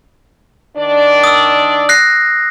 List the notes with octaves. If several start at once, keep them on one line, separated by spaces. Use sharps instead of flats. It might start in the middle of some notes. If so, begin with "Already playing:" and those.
D#3 D4 D5
D#6 E6
F#6 A#6 C7